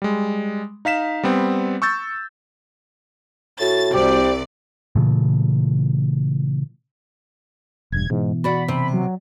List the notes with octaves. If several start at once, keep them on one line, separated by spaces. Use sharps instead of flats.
G3 G#3
D#4 F5 B6 E7
G3 B3 C4
C#6 E6 G6 A6
A2 F#4 A6
C2 G4 C5 D5
A#2 C#3 E3 A3
E1 G2 G#6
G#2 B2 E3
F#4 D5 F#5 B5
C3
F#3